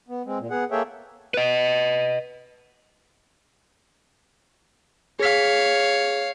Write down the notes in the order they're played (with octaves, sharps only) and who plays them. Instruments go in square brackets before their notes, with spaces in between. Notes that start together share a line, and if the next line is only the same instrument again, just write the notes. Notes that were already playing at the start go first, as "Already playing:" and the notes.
[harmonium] B3
G#3 C4
A#2
B3 G#4 F#5
A#3 G#4 A4 C#5 E5 G5
[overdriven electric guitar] B4 D#5
[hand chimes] G#4 B6 [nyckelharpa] C#5 F5